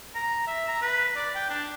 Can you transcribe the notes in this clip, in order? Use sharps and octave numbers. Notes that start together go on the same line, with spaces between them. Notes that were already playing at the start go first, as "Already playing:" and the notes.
A#5
E5
A#5
B4
D5
G5
D4